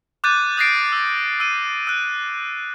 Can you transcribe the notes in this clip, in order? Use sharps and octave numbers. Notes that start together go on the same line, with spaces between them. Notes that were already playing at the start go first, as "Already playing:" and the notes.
D6 F#6 G6 A6 D#7
D#6 F#6 A6 A#6 C7 D7
E6
E6 D#7
E6 F#6